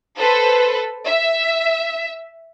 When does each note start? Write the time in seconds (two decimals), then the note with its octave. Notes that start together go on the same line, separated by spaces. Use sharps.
0.18 A4 B4 C5
1.06 E5